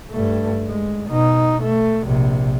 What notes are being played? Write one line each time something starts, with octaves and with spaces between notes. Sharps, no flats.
G2 A3
G#3
B2 D#4
A3
A#1 C3